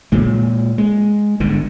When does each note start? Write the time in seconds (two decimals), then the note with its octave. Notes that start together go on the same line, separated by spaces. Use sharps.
0.12 A#2 G#3
0.78 G#3
1.40 G1 G#2 D3